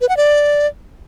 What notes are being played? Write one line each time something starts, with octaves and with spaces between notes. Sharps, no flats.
B4
F#5
D5